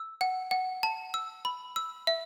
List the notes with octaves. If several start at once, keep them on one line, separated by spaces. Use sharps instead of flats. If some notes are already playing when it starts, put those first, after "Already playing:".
Already playing: E6
F#5
F#5
A5
E6
B5
E6
E5